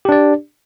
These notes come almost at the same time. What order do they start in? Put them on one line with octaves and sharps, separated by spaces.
G4 D4 D5